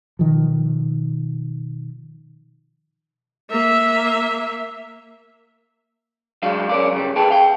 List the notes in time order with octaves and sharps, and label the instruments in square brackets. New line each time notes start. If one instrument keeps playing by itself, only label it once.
[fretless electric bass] B2 D#3 F3
[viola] A#3 E5
[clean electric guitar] F#3 G#3 D4 F5
C#4 A#4 D5
G2 C#3 G3
C2 G#4 A4 B4 G5 A5
F5 G5